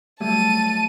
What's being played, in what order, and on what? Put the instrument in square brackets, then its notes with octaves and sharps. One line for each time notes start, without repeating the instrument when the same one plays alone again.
[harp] F#3 G3 A3 [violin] A5 D#7